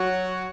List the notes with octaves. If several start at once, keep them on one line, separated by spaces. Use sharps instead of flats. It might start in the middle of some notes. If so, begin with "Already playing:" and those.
Already playing: F#3 F#4